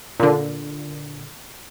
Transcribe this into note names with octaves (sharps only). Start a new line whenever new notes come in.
A#2 D3